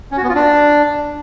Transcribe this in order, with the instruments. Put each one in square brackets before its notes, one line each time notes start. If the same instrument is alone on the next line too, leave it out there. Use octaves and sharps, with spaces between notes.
[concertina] C#4
F#4
B3
F4
D4